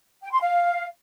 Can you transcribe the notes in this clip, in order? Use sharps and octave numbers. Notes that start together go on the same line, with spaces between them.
G5
C6
F5